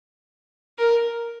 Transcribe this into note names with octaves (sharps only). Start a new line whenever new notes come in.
A#4